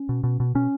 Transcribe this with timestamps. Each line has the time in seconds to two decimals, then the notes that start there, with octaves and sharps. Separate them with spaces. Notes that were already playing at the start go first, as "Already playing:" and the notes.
Already playing: C#4
0.09 B2
0.24 B2
0.40 B2
0.55 B2 C#4